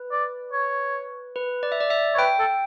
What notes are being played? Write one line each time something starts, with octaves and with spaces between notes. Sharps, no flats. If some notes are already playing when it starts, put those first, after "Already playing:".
Already playing: B4
D5
C#5
B4
D5
E5
D5
E5
C#5
B4 G5
A4